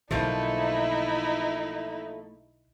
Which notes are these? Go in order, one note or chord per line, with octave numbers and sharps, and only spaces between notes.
B1 B2 D3 F3 A3 A#3 D#4 E4